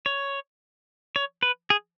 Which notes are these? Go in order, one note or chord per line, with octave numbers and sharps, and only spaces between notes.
C#5
C#5
B4
G#4